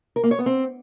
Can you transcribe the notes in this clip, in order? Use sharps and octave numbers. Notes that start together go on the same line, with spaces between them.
A#4
A#3
C#5
B3
C4